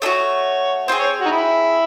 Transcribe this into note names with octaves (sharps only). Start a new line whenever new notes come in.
A3 D4 F#4 C#5
C4 F4 G#4 C5
C#5
D#4 F#4
E4